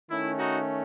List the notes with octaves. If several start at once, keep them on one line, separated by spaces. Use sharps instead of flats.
D#3 A3 C#4 E4
D#4 F#4